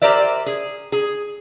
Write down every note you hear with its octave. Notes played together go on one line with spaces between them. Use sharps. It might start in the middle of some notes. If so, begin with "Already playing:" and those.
G4 A#4 C5 D5 E5
G#4
G#4